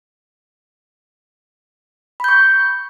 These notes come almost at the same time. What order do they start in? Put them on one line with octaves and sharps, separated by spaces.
B5 G6 C#6